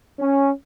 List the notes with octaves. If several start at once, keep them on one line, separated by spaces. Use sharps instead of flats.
C#4